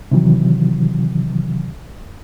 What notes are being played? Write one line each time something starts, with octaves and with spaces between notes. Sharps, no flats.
C3 D#3 E3 F#3